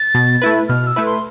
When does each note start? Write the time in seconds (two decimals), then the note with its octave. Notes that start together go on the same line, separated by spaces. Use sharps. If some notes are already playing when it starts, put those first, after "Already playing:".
Already playing: A6
0.14 B2
0.42 A3 E4 B4
0.69 B2 F6
0.87 E6
0.96 A3 E4 B4
1.06 C6